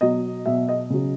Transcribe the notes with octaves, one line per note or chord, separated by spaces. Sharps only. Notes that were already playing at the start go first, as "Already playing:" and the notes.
B2 F#3 D#5
B2 F#3 E5
D#5
C#3 F#3